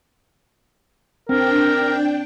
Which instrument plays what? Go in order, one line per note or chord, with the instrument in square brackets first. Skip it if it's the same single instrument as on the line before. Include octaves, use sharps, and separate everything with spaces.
[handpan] C4 [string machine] D4 G5 [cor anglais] A#4